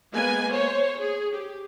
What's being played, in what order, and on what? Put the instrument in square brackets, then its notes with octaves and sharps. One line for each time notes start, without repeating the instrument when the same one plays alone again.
[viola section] G#3 A#3 B3 B4 G#5
C5 C#5
G#4
G4